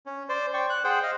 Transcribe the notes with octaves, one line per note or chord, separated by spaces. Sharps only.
C#4
C5 D5
D5 G5 C#6
F#6
G#4 C5 F#5 G5
D#5 F5